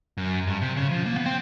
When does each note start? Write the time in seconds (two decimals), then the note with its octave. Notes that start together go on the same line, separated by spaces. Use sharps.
0.17 F#2
0.47 G2
0.61 C3
0.76 C#3
0.91 F3
1.06 A#3
1.16 B3
1.26 C4